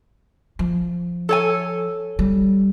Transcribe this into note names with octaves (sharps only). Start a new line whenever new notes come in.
F3
A4 C#5 G#5
G3